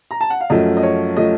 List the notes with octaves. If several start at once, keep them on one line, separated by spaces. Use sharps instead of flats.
A#5
A5
F#5
F5
F#2 F3 A3 D#5
D#5
C#5
F3 A3 D#5